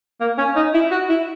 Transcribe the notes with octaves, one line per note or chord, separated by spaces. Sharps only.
A#3
C#4
D#4
E4
F#4
E4